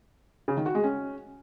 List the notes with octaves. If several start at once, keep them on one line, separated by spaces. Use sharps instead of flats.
C#3
D#3
F#4
G#3
C#4